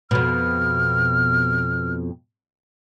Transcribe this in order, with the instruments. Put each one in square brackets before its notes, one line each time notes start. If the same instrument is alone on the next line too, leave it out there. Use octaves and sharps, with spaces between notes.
[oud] F2 B2 [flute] F6